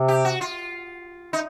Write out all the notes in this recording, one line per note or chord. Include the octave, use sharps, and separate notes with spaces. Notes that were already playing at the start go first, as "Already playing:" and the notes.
Already playing: C3
G4
F#4
F4
D#4